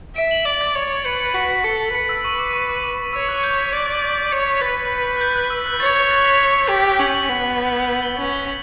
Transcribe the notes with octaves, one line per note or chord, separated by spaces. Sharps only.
E5 D7
F#7
D5 F#7
A6
C#5
B4 C#7
C#7
F#4 B6
B6
A4 C#7
B4 C#7
E6
C#6
D6
C#6
D6
D6
C#5 E6
F#6
G6
B6
D5
C#5 C#7
B6
B4 A6
F#6
G6
F#6
E6
F#6
C#5 A6
A6
A6
B6
G4
C#4 F#7
F#7
B3
F#7
G7
C#4 F#7
G7
F#7